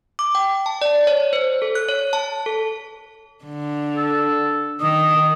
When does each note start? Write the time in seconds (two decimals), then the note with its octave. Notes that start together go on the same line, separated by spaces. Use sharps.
0.19 D6
0.35 G5
0.66 A5
0.82 D5
1.07 C#5
1.33 C5
1.62 A4
1.75 F#6
1.89 C#5
2.13 A5
2.46 A4
3.44 D3
3.97 A4
4.81 D#3 D#6